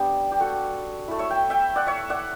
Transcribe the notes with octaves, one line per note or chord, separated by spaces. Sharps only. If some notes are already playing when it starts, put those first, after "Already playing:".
Already playing: G3 B3 D4 G4
G4
F#4 A4
A3 E4
C#5 E5
G5
E5 G5
D5 F#5
C#5 E5
D5 F#5